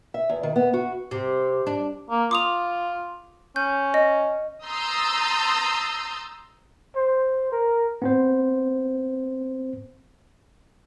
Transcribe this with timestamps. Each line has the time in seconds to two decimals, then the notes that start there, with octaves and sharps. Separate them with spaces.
0.14 E5
0.29 E2
0.43 D#3
0.56 B3
0.74 F#4
1.11 C3
1.67 D4
2.10 A#3
2.31 F4 D6 D#6 F7
3.56 C#4 G6
3.94 D#5
4.65 A#5 C6 D#6 E6 G6 A6
6.96 C5
7.52 A#4
8.02 B3 C4 C5